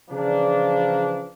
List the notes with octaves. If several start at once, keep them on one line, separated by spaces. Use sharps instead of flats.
C#3 E3 F3 A#3 D4